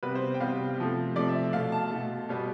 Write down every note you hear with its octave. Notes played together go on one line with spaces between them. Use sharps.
C3 G3 B3 B4
C5
G5
C3 G3 B3 F5
C3 F3 A3
C3 F3 A3 D5
E5
B2 A3 F5
A5
B2 A3
B2 G3 B3